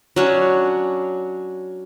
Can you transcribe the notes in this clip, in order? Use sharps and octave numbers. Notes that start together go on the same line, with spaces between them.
F#3 C#4 D4